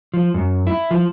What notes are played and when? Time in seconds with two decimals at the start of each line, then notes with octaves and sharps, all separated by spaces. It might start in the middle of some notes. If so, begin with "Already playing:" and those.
0.14 F3
0.34 F#2
0.67 E4
0.91 F3